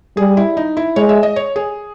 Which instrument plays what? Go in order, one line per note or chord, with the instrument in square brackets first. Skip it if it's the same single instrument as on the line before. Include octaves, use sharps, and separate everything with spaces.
[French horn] G3 [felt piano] G#4
[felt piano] E4
D#4
E4
[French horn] G#3 [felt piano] C#5
[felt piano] E5
D#5
C#5
G#4